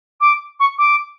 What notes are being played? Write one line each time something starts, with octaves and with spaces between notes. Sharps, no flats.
D6
C#6
D6